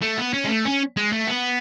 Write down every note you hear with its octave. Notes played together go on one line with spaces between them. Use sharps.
A3
B3
C#4
G#3
A3
C#4
G#3
A3
B3